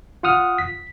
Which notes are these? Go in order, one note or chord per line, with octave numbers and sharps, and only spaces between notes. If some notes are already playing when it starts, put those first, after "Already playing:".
F4 F#5 D#6 F6
B6